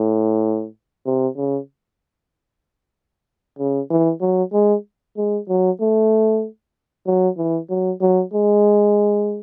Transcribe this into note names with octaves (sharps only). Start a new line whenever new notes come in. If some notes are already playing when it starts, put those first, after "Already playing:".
Already playing: A2
C3
C#3
C#3
E3
F#3
G#3
G#3
F#3
A3
F#3
E3
F#3
F#3
G#3